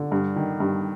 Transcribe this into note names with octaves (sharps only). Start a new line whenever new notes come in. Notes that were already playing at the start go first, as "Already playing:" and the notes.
Already playing: D3
G2
D#3
G2